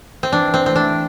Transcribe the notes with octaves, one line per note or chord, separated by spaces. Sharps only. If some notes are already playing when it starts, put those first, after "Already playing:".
C4
E3 D4
C4
A3 C4 E4
D4